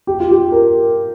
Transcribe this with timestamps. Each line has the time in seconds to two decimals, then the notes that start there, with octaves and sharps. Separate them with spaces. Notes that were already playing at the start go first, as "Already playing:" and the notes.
0.07 G4
0.20 F4
0.31 G4
0.52 A#4